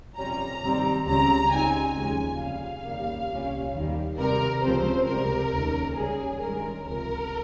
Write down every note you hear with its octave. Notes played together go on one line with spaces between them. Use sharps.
F2 C3 G3 C#4 A#5
G2 D#3 G3 C4
C#2 C#3 G3 C4 A#5
C#2 C#3 G3 C4 D#4 G#5
D#2 C#3 F3 G#3 C#4 G#5
F2 C3 G3 F5
D#2 C#3 G3 A#3
C2 A#2 G3 C#4
D#2 D#3 G3
C3 G3 C4 A#4
C#2 C#3 F3 C4 C5
C#2 C3 G3 A#4
D#2 C#3 G#3 D#4
C#2 C#3 G3 C#4 G#4
G2 D#3 G#3 C#4 A#4
C#2 C3 F3 A#4